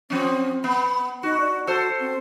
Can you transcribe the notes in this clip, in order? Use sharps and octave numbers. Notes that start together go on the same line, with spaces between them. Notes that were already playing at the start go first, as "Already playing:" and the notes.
F3 C4 C#4
B3 B5
D#4 F#4
D5
F#4 A4 C5
C4